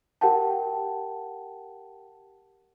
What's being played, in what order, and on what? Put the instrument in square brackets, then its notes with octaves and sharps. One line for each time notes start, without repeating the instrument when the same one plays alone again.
[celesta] G4 A#4 F#5 G5 A5